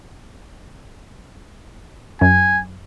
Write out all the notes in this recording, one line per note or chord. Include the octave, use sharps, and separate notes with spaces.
F#2 G#5